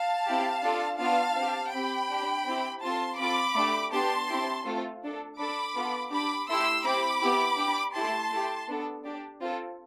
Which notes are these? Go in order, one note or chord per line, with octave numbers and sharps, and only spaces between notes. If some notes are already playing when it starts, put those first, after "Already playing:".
Already playing: F5 A5
C4 E4 G4
D4 F4 A4
B3 D4 F4 F5 A5
C4 G4
C4 G4 G5 B5
D4 G4
C4 E4 G4
C4 F4 A4 A5 C6
C4 F4 A4 B5 D6
A3 D4 G4
B3 D4 G4 A5 C6
C4 E4 G4
A3 C4 F4 A4
D4 A4
D4 A4 B5 D6
B3 F4 A4
D4 G4 B5 D6
A3 E4 G4 C6 E6
C4 E4 G4 B5 D6
B3 E4 G4
D4 G4
A3 E4 G4 A5 C6
A3 E4 G4
B3 D4 A4
D4 G4
C4 F4 A4